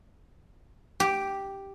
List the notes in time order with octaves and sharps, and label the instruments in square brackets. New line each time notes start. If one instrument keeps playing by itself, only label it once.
[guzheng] G4